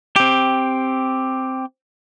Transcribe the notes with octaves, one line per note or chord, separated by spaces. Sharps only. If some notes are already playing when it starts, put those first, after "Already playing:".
C4 G4